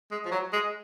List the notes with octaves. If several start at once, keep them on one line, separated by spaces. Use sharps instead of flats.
G#3
F3
F#3
G#3